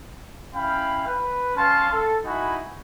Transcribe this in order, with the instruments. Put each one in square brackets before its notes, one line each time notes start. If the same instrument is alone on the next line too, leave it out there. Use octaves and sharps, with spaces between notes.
[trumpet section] C#4 E4 F5 G5 B5
B4
C#4 F5 A5 C6
A4
D#4 E4 F#4 G#5 B5